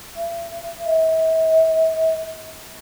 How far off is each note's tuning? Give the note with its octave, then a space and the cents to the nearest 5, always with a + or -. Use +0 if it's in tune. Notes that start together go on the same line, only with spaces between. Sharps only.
E5 +40
E5 -40